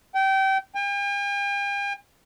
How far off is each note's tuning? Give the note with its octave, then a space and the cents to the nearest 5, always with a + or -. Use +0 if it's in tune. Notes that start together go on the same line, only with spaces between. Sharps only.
G5 -25
G5 +45